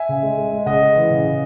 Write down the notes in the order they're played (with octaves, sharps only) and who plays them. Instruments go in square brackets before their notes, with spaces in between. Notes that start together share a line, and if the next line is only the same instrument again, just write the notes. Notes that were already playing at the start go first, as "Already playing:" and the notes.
Already playing: [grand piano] E5 G#5
C#3
G#3
G#3
G#3
C#3 D#5 F#5
G#3
E3
C#3
C#3